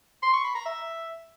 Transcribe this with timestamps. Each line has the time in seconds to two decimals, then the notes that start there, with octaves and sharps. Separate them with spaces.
0.23 C6
0.33 C#6
0.44 B5
0.55 A#5
0.66 E5